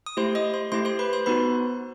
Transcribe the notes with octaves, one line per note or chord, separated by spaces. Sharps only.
D#6
A3 E4 G4 C5 C6
D#5 D#6
C5 C6
A3 E4 G4 C5 C6
C5 C6
B4 B5
C5 C6
B3 D#4 F#4 B4 B5